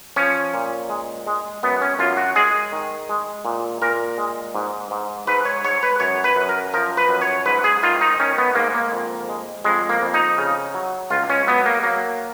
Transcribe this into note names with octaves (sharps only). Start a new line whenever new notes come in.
F3 C#4
A#2
G#3
G#3
F#2 B3
C#4
F#2 F4
F#4
G#3 G#4
D#3
G#3
A#2
A#2 A#4
G#3
G#2
G#2
G#2 B4
C#5
G#2 C#5
B4
F#2 C#5
B4
F#2
A#4
F3 A#4
B4
F#2
C#5
G#2 B4
G#4
D#3 F4
D#4
D#3 C#4
B3
G#2 A#3
A#3
F2
G#3
F2 G#3
A#3
F2
D#4
C#3
F#3
C#2 F4
C#4
F#3 B3
A#3
F#3 A#3